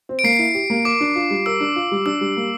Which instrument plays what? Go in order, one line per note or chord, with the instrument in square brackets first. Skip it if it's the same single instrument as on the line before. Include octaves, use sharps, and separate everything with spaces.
[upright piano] C4
[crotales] D7
[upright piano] A#3 [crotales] C7
[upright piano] E4
G4
A#3
[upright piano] A#4 [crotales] D6
[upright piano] D4
F4
G3
[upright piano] A#4 [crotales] E6
[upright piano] D4
F4
G3
[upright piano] D4 [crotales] E6
[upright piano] G3
A#3